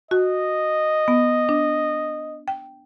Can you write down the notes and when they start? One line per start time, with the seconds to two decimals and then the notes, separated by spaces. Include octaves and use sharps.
0.11 F#4 D#5
1.08 B3
1.49 D4
2.48 G5